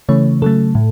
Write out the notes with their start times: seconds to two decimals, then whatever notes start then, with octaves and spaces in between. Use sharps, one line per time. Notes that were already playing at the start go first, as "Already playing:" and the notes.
0.09 C#3 E3 A3 C#5
0.42 C#3 F#3 A3 A4
0.75 A2